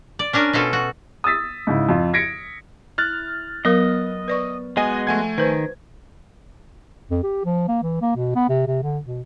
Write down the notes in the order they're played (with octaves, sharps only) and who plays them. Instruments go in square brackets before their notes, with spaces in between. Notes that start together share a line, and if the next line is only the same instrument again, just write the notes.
[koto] D5
C#4 D4 A#4 G#5
B2 C#4 F4 A4
F#4
[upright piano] D#6 E6 A6 B6
G#2 C#3 E4
F2 F4
G#6 A#6 B6 C#7 D7
[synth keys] E4 [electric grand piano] F6 F#6 A6
[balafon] F#3 A#4 F5 [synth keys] B3 [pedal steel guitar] D#5
[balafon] B4 D5 C#6
[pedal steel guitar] G#3 B3 F#4 [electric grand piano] D#5 G#5
[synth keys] F3 [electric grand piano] A3 G#5 G#6 [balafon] F#5 C6
[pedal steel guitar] D#3 [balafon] B4 C5
[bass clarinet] F2
G4
F3
A#3
E3
A#3
B2
B3
C3
C3
D3
B2